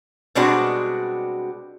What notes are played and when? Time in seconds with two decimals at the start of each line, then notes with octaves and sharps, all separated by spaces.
0.35 B2 G3 G#3 C4 D4 F#4